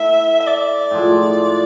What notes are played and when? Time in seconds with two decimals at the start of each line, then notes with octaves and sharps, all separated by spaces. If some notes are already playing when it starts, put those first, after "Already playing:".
Already playing: A3 E4 E5
0.40 E5
0.47 D5
0.91 A2 F3 G#3